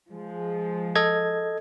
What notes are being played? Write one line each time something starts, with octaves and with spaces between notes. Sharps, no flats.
F3 G#3
A4 D#5 G#6